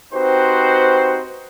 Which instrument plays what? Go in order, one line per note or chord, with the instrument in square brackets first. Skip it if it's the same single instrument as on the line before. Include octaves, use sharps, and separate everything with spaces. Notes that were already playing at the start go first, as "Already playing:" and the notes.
[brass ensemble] C4 D#4 F#4 G4 B4 C5